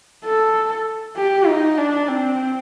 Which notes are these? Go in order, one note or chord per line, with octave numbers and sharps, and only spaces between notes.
A4
G4
D#4
D4
C4